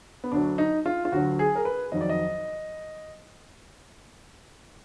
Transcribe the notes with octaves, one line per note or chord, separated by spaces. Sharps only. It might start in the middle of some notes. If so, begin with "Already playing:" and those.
B3
D2 D3 F#3 D4
D#4
F4
F4
D2 D3 F#3 F#4
G#4
A#4
B4
F2 D#3 F#3 D#5
D5
D#5